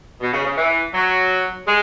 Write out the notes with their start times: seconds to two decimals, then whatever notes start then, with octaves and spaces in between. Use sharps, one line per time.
0.21 B2
0.33 C#3
0.45 C#3
0.56 E3
0.93 F#3
1.66 G#3